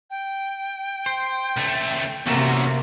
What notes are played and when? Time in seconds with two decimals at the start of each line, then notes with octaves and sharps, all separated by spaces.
0.10 G5
1.06 C5
1.57 C#2 A3
2.27 E2 C3 A3 A#3 C#4 F#4 E5